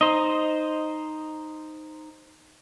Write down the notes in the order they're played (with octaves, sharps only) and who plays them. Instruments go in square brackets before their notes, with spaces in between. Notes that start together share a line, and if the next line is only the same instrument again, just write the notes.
[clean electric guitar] D#4 [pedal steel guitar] C5 D#5